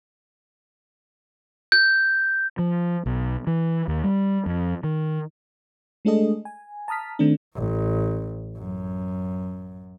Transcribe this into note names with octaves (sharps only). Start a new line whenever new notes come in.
G6
F3
B1
E3
D#2
G3
F2
D#3
G#3 A3 D4 G#4 A4 D#5
G#5
A5 A#5 D#6 F6 B6
D#3 A3 C4 D4
A1
F#2